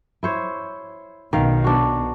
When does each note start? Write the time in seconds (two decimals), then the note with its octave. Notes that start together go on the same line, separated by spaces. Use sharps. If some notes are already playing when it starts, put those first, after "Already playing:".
0.23 E4 C5 C#5
1.33 B1 B2 D#3 F5
1.64 D4 F#4